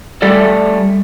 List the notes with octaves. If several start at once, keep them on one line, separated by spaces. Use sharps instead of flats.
G3 A3 A4 D5